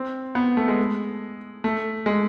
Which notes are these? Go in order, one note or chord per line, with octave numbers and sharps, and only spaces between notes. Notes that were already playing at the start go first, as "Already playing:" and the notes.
Already playing: C4
B3
A3
G#3
A3
G#3